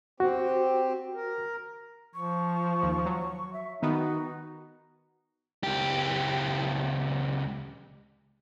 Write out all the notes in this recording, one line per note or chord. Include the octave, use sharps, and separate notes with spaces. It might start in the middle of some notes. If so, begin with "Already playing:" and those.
C4 F#4 G4
A#4
F3 C#6
D#2
F#3
E5
D#3 B3 D#4 F#4
C#2 G4